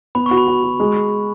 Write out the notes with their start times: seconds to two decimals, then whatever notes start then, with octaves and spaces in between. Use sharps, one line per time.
0.15 B3 B5
0.26 F#4 C#6
0.38 B5
0.48 F#4
0.63 F#4
0.80 G#3